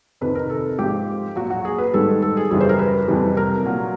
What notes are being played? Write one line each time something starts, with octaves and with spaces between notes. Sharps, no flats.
F2 C3 D#3 B4
A#4
A4
G#2 F3 G4
A#2 F#3 F#4
F#4
G#4
B4
G#2 D#3 G3 A4
A4
G#4
F#2 C#3 E3 G3 G#4
C5
A#4
B4
F2 C3 E3 G3
A#4
A#2 F#3